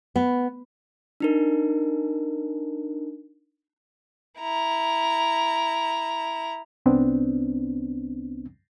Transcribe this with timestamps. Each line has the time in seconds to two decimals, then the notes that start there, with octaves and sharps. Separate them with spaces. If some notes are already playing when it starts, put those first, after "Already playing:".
0.16 B3
1.20 D4 D#4 A#4
4.40 E4 A#5
6.86 C2 B3 C4 D4